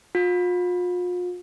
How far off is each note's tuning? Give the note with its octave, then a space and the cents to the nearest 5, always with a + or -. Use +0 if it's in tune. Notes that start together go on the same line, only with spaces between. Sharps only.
F4 +40